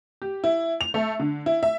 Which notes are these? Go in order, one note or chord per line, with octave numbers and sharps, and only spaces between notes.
G4
E4
F7
A3
D3
E4
E5